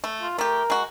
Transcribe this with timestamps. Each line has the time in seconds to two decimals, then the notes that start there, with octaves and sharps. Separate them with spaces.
0.04 A3
0.22 F4
0.38 A3 G4 A#4
0.70 G#3 F#4